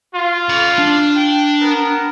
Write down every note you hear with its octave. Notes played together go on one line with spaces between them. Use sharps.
F4
C#4 B5
D4
G5
B3 A#4